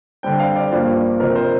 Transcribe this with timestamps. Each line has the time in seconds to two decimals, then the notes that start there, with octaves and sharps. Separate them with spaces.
0.23 D3 G3 C4 G5
0.39 F5
0.55 D5
0.71 G2 F3 A#3
1.20 F2 C3 F3 A#4
1.36 C5